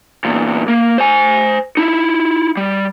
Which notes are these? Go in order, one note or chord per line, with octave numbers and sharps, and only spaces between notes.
E2 A#2
A#3
C5 G#5
D#4 E4
G3